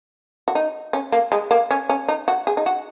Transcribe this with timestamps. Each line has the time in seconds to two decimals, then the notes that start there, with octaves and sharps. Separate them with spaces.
0.48 F#4
0.55 D#4
0.93 C#4
1.12 A#3
1.32 G#3
1.51 A#3
1.71 C#4
1.89 C#4
2.08 D#4
2.28 F#4
2.47 G#4
2.57 D#4
2.66 F#4